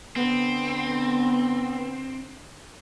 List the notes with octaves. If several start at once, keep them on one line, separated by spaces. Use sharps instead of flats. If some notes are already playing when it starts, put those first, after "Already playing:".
D3 B3 C4